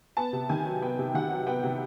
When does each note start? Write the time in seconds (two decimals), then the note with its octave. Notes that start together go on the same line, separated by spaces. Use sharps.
0.17 B3 A5
0.33 C3
0.49 D#3 G#5
0.65 F#3
0.82 B3 G5
0.99 C3
1.14 D#3 F#5
1.30 F#3
1.47 B3 G5
1.64 C3